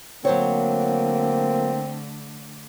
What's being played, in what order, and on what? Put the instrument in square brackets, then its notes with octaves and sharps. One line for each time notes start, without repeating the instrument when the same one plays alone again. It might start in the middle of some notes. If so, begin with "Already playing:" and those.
[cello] D3 A3 [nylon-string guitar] F#3 C5 C#5 [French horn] A#3 [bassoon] C4